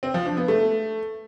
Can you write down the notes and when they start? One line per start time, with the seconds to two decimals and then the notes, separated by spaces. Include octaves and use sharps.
0.03 C4
0.14 F3
0.26 D4
0.37 B3
0.48 A3